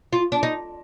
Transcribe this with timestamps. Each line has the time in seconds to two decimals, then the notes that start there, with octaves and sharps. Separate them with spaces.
0.13 F4
0.32 D4
0.43 D#4